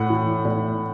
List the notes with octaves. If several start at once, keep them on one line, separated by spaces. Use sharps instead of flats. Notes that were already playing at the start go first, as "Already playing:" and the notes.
Already playing: A2 F#5
E3
A2